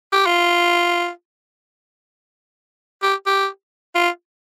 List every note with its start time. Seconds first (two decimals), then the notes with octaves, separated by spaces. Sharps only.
0.13 G4
0.26 F4
3.03 G4
3.26 G4
3.95 F4